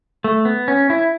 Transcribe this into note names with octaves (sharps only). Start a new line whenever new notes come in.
A3
B3
C#4
E4